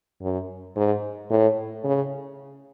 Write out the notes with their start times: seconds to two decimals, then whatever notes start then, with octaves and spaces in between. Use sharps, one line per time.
0.22 F#2
0.76 G#2
1.31 A2
1.84 C#3